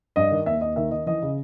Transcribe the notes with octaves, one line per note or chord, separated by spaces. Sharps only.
G2 D#5
D#3
D#2 E5
D#2 D#5
D#3 E5
D#3 D#5
E3 D#5
C#3